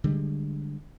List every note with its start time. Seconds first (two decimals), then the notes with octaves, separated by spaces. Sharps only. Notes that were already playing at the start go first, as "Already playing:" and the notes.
0.04 D3 G3 G#3